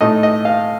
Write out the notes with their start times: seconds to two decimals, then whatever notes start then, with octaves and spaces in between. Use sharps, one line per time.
0.01 A2 A3 D#4 D#5
0.23 D#5
0.45 F5